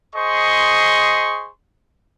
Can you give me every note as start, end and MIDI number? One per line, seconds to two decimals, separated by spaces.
0.16 1.50 68
0.16 1.50 72
0.16 1.50 75
0.16 1.50 84
0.16 1.50 85